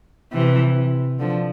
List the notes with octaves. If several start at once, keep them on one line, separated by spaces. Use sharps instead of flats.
C3 E3
D3 F3